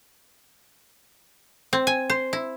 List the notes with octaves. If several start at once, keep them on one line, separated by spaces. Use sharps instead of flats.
C4
G#5
C5
E4